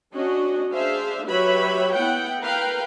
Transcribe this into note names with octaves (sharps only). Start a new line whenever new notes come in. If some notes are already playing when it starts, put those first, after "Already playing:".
C#4 D4 F#4 D#5
D4 G#4 C5 E5 F5
F#3 G4 B4 C#5 E5 B5
B3 E4 F#5 G5
A#4 B4 F5 G5